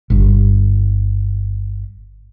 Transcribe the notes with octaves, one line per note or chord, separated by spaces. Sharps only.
G1 G2